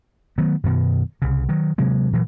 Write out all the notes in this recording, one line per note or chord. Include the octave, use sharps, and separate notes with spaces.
D#3 F#3 A3 B3
F#2 B2 D#3
C2 C#3
D#3 F#3
C3 F#3 G#3 A#3
A#2 E3 F#3